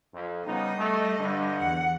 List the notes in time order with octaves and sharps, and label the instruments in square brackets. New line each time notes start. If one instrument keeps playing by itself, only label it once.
[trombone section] F2
[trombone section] C#3 B3 D#4 [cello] G3 D#5
[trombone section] A3
G2 D3
[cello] E2 F#5